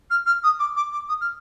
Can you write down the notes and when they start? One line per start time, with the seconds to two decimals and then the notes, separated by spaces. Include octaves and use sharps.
0.10 F6
0.26 F6
0.43 D#6
0.59 D6
0.76 D6
0.92 D6
1.08 D#6
1.20 F6